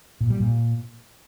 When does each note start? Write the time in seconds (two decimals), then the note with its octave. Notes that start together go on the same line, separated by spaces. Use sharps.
0.21 A#2
0.30 G3
0.40 A#2